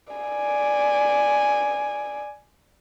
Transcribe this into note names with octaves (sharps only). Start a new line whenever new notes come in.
D5 G#5